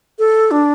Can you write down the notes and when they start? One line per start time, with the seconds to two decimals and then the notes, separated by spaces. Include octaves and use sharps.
0.19 A4
0.51 D4